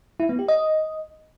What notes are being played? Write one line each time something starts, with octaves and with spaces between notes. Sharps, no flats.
E4
B3
G4
D#5